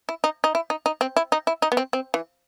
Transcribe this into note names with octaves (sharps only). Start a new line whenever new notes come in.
E4
D#4
D#4
E4
D#4
D#4
C4
E4
D#4
E4
D#4
B3
C4
C4
E3